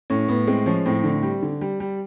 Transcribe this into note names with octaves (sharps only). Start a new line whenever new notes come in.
A2 C#4
A2 B3
G#3 C4
F3 C#4
A2 C4
D3
G3
D3
G3
G3